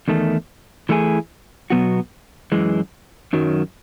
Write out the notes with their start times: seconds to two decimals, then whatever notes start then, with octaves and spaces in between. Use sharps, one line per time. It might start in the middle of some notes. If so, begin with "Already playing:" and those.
0.08 E2 D#3 A3
0.89 E3 A3 E4 G#4
1.70 B2 F#3 B3 F#4
2.52 F#2 E3 G#3
3.33 F#2 D#3 F#3